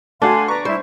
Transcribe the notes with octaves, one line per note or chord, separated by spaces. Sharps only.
A3 D4 F#4 F5 G#5 C6
B4 D5 A#5 C#6
G3 A3 E4 C5